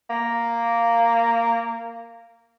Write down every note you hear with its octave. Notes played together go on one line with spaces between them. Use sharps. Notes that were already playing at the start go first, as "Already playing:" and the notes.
A#3